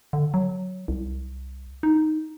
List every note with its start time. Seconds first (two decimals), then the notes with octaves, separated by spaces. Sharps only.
0.13 D3
0.34 F#3
0.88 C2
1.83 D#4